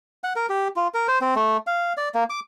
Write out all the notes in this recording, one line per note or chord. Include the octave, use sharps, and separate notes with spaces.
F#5
A#4
G4
F4
A#4
C5
C4
A3
F5
D5
A#3
D6